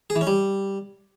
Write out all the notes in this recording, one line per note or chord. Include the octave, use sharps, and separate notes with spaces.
G#4
E3
C#4
G3